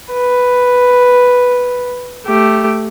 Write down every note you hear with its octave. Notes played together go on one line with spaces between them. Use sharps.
B4
A3 G4